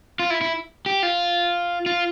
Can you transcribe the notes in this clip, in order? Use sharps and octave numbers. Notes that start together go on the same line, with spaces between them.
F4
E4
E4
G4
F4
F4